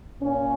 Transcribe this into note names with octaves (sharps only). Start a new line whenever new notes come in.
A#2 C#4